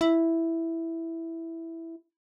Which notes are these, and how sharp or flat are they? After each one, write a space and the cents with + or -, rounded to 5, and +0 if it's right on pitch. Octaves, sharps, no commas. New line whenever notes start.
E4 +0